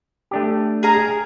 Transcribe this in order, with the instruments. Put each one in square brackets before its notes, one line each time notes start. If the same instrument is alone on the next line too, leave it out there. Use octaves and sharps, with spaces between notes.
[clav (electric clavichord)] A3 D4 G4
[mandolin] G#4 A#4 A#5